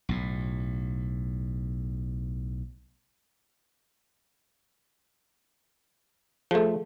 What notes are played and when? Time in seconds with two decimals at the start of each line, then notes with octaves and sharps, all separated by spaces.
0.09 B1 A2
6.51 F3 A3 G#4 A4